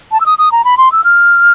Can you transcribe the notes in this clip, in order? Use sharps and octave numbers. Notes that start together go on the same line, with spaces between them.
A5
E6
D#6
D#6
A#5
B5
C6
E6
F6